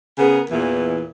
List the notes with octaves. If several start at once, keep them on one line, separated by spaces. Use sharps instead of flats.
C#3 B3 G#4 A#4
E2 A#2 E3